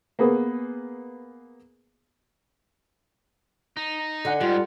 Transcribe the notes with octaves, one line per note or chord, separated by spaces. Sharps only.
A#3 B3 G#4 B4
D#4
D3 D#5 F#5 G#5
G#2 G3 F4